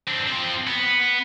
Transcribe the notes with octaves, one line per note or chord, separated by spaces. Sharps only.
C4 D4
F3 C4
B3